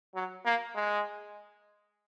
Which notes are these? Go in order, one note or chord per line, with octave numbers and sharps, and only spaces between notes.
F#3
A#3
G#3